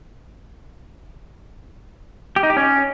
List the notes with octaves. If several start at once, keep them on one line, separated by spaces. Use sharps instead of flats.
G4
D#4
G4
C#4